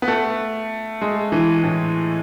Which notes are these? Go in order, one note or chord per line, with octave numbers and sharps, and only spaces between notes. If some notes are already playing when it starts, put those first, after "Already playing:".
B3
A3
G#3
E3
A2